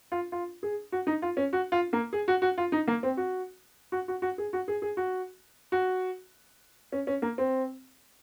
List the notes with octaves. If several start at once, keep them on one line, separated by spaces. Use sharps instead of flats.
F4
F4
G#4
F#4
D#4
F4
C#4
F#4
F4
A#3
G#4
F#4
F#4
F4
D#4
A#3
C4
F#4
F#4
F#4
F#4
G#4
F#4
G#4
G#4
F#4
F#4
C#4
C#4
A#3
C4